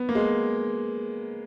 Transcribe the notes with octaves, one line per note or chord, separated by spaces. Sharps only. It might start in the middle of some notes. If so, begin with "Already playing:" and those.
Already playing: B3
A#3
G#3